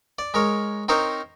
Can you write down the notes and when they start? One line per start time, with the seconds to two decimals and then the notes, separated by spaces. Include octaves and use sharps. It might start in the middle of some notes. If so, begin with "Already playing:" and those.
0.19 D5
0.34 G#3 A#4 C#5
0.88 C4 D#4 A#4 C5 C#5